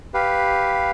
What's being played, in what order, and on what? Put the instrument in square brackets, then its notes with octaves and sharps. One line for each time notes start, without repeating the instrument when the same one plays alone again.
[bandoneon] G4 B4 F5